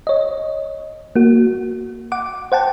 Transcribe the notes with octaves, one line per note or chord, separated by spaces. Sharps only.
C#5 D#5
A#3 F#4
F#5 D6
C5 F#5 G5 A5